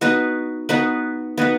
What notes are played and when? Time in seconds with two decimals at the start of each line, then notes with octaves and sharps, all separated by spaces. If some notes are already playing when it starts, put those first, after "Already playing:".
0.01 B3 D#4 F#4 B4
0.69 B3 D#4 F#4 B4
1.38 B3 D#4 F#4 B4